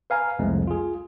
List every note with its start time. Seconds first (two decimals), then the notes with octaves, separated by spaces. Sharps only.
0.10 B4 F5 G#5 A#5
0.39 C2 F2 G#3 A3
0.67 F4 G#4